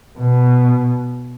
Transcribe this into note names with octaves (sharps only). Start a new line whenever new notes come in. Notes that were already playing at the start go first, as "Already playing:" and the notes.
B2